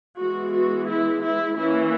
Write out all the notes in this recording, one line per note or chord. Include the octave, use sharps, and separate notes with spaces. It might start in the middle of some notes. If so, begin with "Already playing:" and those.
E3 G#3 B3 F#4
F#4
E4
E4
E3 A#3 C#4 E4